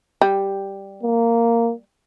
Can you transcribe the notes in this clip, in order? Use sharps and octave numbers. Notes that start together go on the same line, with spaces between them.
G3
A#3